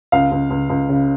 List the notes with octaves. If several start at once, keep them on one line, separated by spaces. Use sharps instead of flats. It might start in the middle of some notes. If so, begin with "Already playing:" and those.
C#2 F5
C#2
C#2
C#2
C#3